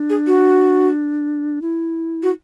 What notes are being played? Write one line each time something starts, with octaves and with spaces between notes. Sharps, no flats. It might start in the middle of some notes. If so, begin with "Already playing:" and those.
Already playing: D4
G#4
F#4
E4
F#4